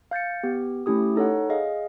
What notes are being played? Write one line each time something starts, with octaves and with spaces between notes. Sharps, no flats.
F5 G6 A6 C#7
B3 G4
A3 C#4 E4 G4 D#6
D#4 A4 C#5 F#5
G#4 D#5 F5